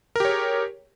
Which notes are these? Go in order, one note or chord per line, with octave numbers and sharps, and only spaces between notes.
G4 G#4 A#4 C#5